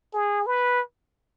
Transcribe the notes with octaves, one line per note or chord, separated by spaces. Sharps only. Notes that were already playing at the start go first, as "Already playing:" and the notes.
G#4
B4